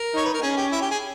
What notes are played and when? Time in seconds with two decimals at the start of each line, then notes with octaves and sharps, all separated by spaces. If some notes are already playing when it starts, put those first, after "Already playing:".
Already playing: A#4
0.14 D#4 C#5
0.25 B4
0.34 A#4
0.42 C#4 G#4
0.56 G4
0.72 E4
0.82 G4
0.91 G#4